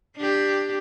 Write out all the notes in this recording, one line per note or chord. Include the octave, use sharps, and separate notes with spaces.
D4 G4